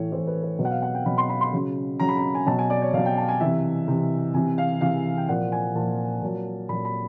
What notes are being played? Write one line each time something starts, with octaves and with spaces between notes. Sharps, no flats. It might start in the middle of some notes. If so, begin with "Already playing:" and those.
Already playing: A2 E3 C#5
A2 E3 C5
B4
B4
B2 F#3 B4
F#5
F5
F#5
G5
B2 F#3 B5
C6
B5
C6
C#3 F#3
C#3 F#3 A#5
B5
A#5
G#5
B2 F#3 A5
G#5
D5
C#5
B2 F#3 F5
G5
A5
G#5
C3 E3 E5
C3 E3
C3 E3 G#5
F5
C3 E3 F5
G5
A#2 F3 F#5
G#5
A#2 F3 A5
A#2 F#3
A#2 F#3 B5
B5